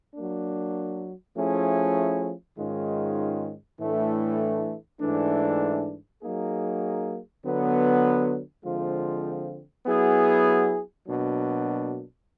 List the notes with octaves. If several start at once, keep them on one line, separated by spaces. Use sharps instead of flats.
F#3 A#3 D4
F3 A3 C#4 E4 G#4
G#2 D#3 G#3 C#4 F4
A2 E3 A3 D4
G#2 E3 A3 D4
F#3 A#3 D#4 G#4
D3 F#3 B3
D3 F3 G#3 C4 F4
F#3 B3 E4 G#4
B2 F#3 A#3 D4